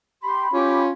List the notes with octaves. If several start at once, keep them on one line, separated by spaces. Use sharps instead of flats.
G4 B5 C6
C#4 F4 G4 C#6 D6